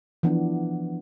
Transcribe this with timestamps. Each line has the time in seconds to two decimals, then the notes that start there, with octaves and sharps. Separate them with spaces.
0.23 E3 F3 B3 D4